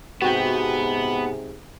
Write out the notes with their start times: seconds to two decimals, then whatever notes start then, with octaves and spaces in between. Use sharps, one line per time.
0.22 G#2 C3 B3 F#4 G5